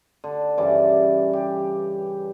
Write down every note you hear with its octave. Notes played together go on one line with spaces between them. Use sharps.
D3
G2 C#3 E3 D5
G4